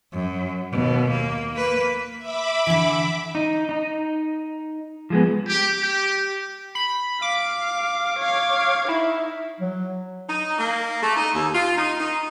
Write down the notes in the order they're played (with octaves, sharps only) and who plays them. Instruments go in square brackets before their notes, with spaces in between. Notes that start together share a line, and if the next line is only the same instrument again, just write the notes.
[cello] F#2
D#2 B2
A#3
A#3 B4
[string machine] E5 B5 D6
[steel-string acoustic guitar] D3 E3
[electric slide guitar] D#4
D#4
F3 G#3 B3
[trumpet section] G4
G4
[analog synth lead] B5
[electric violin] F5 [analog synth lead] D6
[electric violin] C#5 F5
[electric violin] D#4 [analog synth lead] E4
[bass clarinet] F#3
[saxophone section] D#4
A#3
A3
D#4
D#2
F4
D#4
D#4